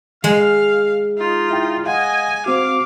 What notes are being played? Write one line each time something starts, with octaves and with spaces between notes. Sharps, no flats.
G#3 F5 F6
D#4 F4
E4 G5
D#5 F5 F#5 G#5
C4 F#4 F5 D6